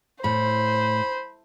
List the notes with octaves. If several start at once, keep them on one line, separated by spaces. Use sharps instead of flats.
A2 C5 B5